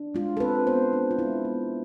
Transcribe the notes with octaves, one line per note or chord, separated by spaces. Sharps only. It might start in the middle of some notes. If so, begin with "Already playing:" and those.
Already playing: D4
G#3 F4
A4
C4 B4
B3 C5
D4
F4
G#3 E4
B3